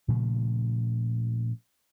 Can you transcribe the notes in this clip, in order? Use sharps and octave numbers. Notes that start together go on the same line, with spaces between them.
A#2 C#3 F3 A3